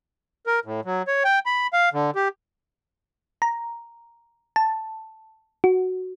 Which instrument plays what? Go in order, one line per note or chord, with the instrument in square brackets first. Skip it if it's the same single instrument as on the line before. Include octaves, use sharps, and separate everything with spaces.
[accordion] A#4
A2
F#3
C#5
G5
B5
F5
D3
G4
[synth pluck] A#5
A5
F#4